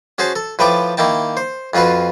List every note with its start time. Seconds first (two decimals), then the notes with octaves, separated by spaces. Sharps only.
0.18 C#4 F#4 G#4 C5 A5
0.36 A4
0.59 A2 F3 B4 G5 A5 D6
0.97 D#3 A#3 E4 G5 A5
1.37 C5
1.74 F2 C4 F4 F#4 B4